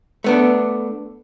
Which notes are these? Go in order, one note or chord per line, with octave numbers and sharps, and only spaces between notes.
A3 B3 D4